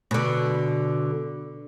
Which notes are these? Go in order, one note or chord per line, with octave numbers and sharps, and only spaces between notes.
B2 D3